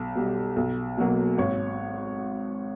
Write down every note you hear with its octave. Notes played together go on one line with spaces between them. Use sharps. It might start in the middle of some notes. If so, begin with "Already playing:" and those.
Already playing: B1
B2 G3
B1
B2 F#3 A#3
G#1 C#5